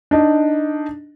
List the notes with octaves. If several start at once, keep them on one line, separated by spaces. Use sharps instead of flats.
D4 D#4